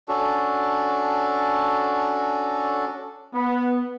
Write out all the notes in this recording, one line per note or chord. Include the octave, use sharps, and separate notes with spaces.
C#4 D4 F#4 A4
B3